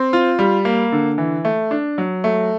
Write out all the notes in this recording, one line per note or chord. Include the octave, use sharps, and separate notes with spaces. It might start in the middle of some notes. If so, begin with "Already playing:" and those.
Already playing: C4
F4
G3
A#3
D3
E3
A3
D4
F#3
A3